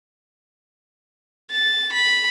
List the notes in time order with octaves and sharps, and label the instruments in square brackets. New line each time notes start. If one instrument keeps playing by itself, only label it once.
[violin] A6
B5